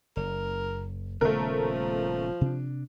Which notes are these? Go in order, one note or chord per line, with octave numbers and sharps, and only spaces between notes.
F#1 A#4
D#1 C#3 F3 A3 B3 A#4
C3 D4